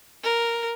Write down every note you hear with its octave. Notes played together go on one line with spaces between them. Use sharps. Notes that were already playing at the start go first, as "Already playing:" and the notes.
A#4